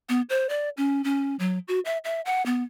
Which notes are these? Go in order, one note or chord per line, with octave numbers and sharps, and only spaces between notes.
B3
C5
D5
C#4
C#4
F#3
F#4
E5
E5
F#5
B3